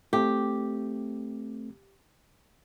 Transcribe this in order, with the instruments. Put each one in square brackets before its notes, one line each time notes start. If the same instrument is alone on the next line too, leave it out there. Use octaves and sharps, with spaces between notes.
[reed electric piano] A3 C4 [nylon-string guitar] G4